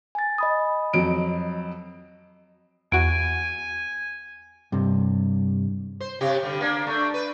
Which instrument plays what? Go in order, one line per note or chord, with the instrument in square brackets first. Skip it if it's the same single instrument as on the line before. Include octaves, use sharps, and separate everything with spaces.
[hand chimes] G#5 A6
D#5 B5 D#6
[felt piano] F2 F#3 D7
[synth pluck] E2 F#4 [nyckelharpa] G#5 [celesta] D7
[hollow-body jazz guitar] G2 C3
[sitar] C5
C3 G4
D3 G3
A#3 D4
A3 D4
B4